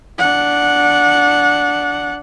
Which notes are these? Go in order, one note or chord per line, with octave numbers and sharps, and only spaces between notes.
D4 F#5